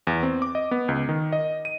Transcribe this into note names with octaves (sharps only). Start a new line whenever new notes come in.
E2
C4
D6
D#5
B3
C#2
D#3
D#5
D#7